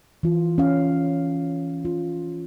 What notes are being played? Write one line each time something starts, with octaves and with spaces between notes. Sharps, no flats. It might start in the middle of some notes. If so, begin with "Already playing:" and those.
E3 F4
C#4 F5
F4